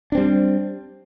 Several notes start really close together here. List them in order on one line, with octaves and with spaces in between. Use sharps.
D4 C4 G3